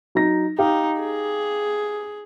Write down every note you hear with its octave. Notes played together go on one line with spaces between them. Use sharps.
F#3 D#4 A#6
D#4 G4 F5
G#4